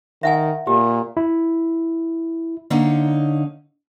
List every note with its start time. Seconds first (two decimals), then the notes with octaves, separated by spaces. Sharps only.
0.23 D#3 E5 F#5 G#5
0.67 A#2 G4
1.17 E4
2.70 D3 A#3 C#4 D#4